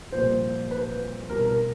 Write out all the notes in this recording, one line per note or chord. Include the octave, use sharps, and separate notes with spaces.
C2 A#2 F3 C5
B4
C2 B2 A#4
A#4